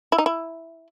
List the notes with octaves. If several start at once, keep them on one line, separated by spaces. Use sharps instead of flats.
E4
D#4
E4